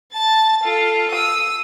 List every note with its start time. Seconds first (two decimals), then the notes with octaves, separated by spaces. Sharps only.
0.13 A5 A6
0.63 F4 A4
1.11 D#6 E6